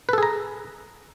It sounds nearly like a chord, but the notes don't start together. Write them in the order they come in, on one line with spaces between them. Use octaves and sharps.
B4 A4 G#4 A#5